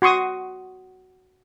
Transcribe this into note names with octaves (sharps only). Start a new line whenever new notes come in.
F#4 C6 C#6 D#6